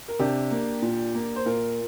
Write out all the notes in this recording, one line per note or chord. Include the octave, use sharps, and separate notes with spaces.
A#4
C3 D4 G4
A#3
A#2
A#3
C5
A#2 F4 A#4